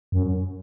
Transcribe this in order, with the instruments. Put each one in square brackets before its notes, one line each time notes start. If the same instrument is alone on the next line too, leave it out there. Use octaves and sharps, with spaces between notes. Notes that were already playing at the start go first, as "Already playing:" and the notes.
[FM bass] F#2